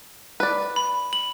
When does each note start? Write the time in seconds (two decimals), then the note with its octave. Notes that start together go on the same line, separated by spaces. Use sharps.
0.40 B4 D5
0.76 B5
1.13 F#7